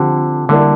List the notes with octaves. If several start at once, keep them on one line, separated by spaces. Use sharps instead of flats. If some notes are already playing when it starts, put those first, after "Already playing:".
Already playing: D3 F3 C4 G4
D3 G3 A#3 E4 A#4 D5